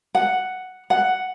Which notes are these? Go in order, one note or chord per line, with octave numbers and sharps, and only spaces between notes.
F#5
F#5